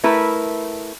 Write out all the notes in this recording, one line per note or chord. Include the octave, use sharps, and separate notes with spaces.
A3 E4 A#4 B4